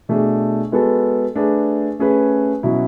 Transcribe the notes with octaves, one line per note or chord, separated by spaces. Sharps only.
B2 A3 D4 G#4
G#3 B3 F#4 A4
A3 D4 G#4 B4
A3 C#4 G#4 B4
B2 F#3 C#4 E4